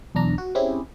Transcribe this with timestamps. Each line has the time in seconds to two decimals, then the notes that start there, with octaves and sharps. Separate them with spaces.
0.15 B1 E2 D4 A#5
0.38 F#4
0.55 C4 C#4 E4 G4 G#4